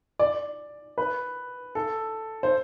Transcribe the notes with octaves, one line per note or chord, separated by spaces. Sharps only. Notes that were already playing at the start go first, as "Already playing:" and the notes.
D5
B4
A4
C5